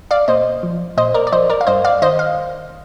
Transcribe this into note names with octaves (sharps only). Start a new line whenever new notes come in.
D5 F5
A#2 C5 D#5
F3
A#2 C5 D#5
A#4 D5
D5
F3 C5 D#5
A#4 D5
F5
G2 C5 D#5
D5 F5
D#3 C5 D#5
F5